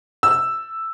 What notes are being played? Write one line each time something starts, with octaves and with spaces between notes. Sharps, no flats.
E6